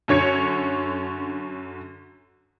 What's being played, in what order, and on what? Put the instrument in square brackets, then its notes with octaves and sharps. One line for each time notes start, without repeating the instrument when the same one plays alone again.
[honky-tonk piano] F#2 D3 C#5 G#6 C#7